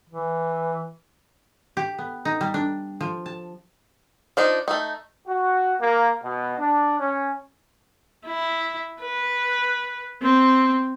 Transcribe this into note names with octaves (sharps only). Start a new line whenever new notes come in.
E3
G4
B3
D#4
G3
D4
F3
A5
F3 D4 D#4
A3 D#4
F#4
A#3
B2
D4
C#4
E4
B4
C4